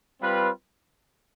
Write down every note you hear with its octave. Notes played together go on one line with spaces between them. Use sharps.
G3 C4 F4 B4